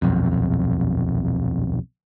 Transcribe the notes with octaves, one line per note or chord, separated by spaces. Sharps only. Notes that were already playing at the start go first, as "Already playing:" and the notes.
D#1 B1 F2